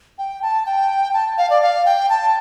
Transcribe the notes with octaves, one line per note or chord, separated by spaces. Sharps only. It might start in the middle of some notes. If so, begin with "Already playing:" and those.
G5
A5
G5
A5
F5
D5
F5
G5
A5